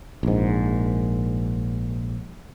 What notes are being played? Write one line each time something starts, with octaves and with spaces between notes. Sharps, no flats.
A#1 G#2